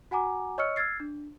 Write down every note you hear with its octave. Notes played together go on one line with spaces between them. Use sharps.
F#4 F#5 G#5 A#5 D6
C#5 D#5 C#6 E6 F6 C#7
E6 F6 G#6 A6 C7
D4